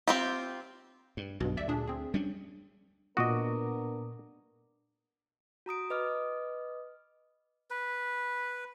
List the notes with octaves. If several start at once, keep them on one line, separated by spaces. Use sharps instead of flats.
C4 F4 G4
G2
B1 G2 B2
D2 D5 E5
A#2 D4 G#4
C4 G#4
G3 C#4 D4
A#2 B3 D4 F#4 A#4 D#5 D6 D#6
F#4 A#5 D#6 D7
B4 D#5 D6 D#6 F6
B4